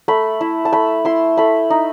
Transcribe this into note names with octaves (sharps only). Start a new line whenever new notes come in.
A3 B5
E4
A5
A3 B5
E4 C6
A3 B5
D#4